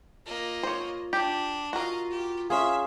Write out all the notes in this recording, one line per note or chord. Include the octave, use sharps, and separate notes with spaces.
A#3 F4 D#5
C5 C#5
D4 G4
F4 F#4 A#4 D#5 F5
G4
C#4 F4 G#4 E5 F5